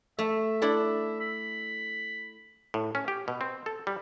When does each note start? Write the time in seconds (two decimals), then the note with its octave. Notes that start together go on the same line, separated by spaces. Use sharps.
0.19 A3 E5
0.62 D4 E4 A4
1.20 B5
2.74 A2
2.95 C#4
3.08 G4
3.28 B2
3.41 C4
3.66 A4
3.87 G3